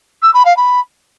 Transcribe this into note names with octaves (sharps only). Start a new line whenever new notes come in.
E6
B5
F5
B5